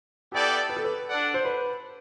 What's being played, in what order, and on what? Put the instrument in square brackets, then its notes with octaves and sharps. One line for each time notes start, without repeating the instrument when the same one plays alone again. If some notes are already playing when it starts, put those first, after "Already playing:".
[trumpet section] B3 E4 A4 D5 G5 [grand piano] G4
[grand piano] B4
A4
B4
[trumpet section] D4 A4 D5 F#5
[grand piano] C5
B4